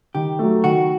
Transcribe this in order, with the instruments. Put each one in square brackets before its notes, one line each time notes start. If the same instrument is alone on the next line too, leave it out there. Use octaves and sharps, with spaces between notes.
[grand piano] D#3 [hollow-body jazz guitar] G4
[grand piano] F#3 A3
[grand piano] D#3 [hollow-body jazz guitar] F#4